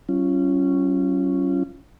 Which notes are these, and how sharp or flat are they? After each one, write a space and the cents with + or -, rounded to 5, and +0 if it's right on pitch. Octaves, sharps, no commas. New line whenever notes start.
F#3 +40 C#4 +0 F4 -25